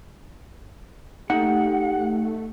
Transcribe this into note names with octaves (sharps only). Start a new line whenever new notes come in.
A3 D#4 G4 F#5